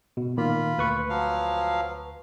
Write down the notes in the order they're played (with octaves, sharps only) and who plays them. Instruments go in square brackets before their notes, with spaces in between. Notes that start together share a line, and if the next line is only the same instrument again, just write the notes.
[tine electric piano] B2
[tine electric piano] A#2 D#3 A#3 [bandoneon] F4 B5
[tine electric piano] D2 B4 C#6
[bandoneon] F3 F#3 F5